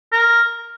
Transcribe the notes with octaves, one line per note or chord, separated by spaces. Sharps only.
A#4